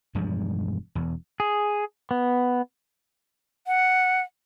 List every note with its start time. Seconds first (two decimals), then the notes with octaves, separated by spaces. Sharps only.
0.15 E1 G2 F3 G#3
0.95 E1 E2
1.40 G#4
2.11 B3
3.67 F#5